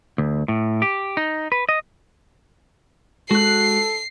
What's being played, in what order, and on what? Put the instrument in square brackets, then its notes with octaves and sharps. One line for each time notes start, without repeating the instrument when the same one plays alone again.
[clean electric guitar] D2
A2
G4
D#4
B4
D#5
[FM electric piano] G#3 [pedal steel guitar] F#4 F#6 [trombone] A4 [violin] C7